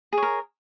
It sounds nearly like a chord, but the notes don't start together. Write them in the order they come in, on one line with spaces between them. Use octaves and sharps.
G#4 C#5 A#4